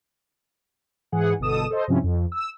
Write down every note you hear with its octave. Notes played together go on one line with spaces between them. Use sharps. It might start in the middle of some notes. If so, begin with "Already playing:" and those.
G#2 E3 G#4 F#5
G1 B2 A4 D#6 E7
A4 C5 D#5
G2 C3 F3 C4 C#4 E4
F2
E6